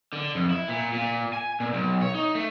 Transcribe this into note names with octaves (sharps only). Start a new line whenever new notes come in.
D3
F2
E4
A#2
A#2
G#5
A#2
B1
C#5
D#4
A3